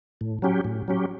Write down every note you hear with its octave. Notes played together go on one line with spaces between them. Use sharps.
A2
F#3 C#4 G4
A2
F#3 C#4 G4